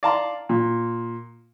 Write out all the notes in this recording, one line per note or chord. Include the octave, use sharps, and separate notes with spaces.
D5 F5 A5 A#5 C6
A#2